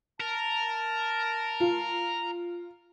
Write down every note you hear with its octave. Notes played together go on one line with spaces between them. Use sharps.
A#4 A5
F4